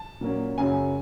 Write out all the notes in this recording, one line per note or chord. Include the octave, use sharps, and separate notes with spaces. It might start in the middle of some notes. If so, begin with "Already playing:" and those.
Already playing: A5
A#2 F#3 A#3 C#4
F#2 C#3 F#3 G#5